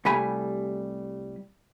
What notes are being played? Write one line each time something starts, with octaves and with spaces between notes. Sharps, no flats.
C2 G3 A3 G#5 B5